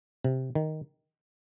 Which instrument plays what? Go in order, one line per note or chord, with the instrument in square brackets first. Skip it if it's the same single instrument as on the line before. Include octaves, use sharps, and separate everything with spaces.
[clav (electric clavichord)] C3
D#3